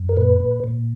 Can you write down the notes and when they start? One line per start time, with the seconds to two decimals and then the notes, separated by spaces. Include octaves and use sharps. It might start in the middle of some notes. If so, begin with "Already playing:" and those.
Already playing: F#2
0.09 A#4
0.17 A#2 B4
0.40 A#2
0.64 A#2